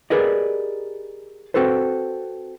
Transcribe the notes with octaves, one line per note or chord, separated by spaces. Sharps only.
G4 G#4 A#4 B4 D5 D#5
C4 F#4 A4 B4 C5